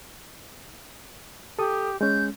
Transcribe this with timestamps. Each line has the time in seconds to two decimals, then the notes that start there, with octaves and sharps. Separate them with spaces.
1.59 G4 A4 D#6
2.01 G#3 C#4 G6